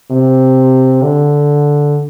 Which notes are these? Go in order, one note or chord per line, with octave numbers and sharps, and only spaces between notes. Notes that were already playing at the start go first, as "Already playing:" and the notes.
C3
D3